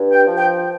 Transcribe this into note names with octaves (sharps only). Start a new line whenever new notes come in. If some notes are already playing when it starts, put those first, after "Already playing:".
Already playing: G2
G5
F3
G5